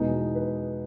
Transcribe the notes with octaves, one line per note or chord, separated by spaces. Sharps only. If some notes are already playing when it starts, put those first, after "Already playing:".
Already playing: E2 B2 G#3 B3 D#4
B4